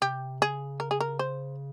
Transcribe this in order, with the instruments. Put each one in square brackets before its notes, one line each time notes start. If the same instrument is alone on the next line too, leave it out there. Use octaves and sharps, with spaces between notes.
[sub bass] C3 [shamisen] G4
[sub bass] C#3 [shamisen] G#4
[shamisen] A#4
G#4
A#4
C5